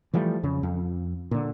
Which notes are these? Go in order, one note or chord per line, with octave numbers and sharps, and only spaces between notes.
E3 F3 G3 A3
F2 C#3
F2
A#2 D3